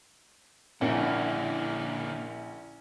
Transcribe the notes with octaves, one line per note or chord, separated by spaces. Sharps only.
A#1 D3 A#3 C#4 E4 A#4 F#5